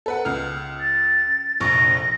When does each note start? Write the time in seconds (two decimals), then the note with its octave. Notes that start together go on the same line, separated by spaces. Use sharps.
0.06 A4 B4 F#5
0.25 C#2 F6
0.80 A6
1.60 F1 A#1 C#6 A#6